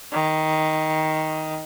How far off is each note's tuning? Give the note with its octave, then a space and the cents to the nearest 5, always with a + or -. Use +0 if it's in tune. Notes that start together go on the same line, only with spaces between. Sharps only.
D#3 +10